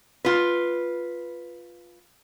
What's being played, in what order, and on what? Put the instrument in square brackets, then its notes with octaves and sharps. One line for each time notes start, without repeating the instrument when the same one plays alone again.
[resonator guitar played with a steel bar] F4 B4